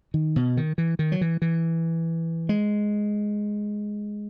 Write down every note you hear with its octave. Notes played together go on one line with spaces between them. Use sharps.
D#3
B2
D#3
E3
D#3
F#3
E3
E3
G#3